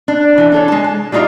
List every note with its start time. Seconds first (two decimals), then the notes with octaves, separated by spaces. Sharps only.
0.08 D4
0.38 E3 A4
0.52 D4 A4 C#5
0.68 G#3 A5
0.84 A5
1.12 G3 D4 D#4 F4 D5 E5